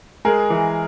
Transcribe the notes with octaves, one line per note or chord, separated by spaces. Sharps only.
G#3 G#4 A#4
E3